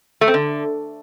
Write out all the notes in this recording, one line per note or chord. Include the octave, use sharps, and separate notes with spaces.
A3
C4
D3